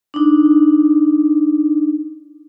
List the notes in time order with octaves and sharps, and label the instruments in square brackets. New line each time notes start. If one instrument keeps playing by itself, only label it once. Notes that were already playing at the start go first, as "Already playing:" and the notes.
[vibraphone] D4 D#4